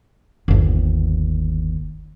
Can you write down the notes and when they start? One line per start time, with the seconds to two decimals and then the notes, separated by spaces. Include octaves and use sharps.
0.48 G1 D#2